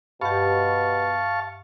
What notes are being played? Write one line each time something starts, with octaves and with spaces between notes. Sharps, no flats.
G2 B2 G4 F5 A5 C#6